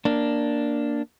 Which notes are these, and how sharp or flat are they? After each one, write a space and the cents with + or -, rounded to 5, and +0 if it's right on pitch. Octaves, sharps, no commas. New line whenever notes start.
A#3 +0 D4 +0